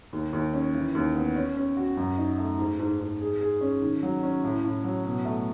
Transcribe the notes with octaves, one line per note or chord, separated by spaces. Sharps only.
D#2
D#2
C#4
E3
D#2
B3
C#4
C#4
F#4
F#2
D#4
A3
G#2
G#2
G#2
G#4
G#4
C#4
D#3
F#3
C#4
A2
A2
F#3
B2
A3